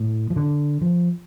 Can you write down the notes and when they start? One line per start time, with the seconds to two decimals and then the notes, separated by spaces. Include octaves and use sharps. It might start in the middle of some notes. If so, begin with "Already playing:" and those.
Already playing: A2
0.30 F3
0.36 D3
0.81 F3